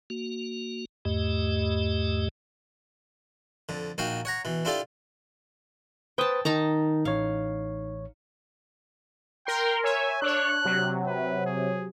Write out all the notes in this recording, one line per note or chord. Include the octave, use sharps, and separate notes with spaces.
A#3 F#4
E2 G#2 A3 G4 D#5
F2 D3
A#1 D#4 F#4 F5 G5
C#5 F#5 A#5
B2 E3
D4 E4 F4 G4 A4 D5
B4 C5 G5 A5 D#6
D#3 D#4 A5 A#5
A1 C#5 F5
A#4 G5 C6
C#5 E5 G#5
D4 C#5 F#6
C3 F#3
B4
G#4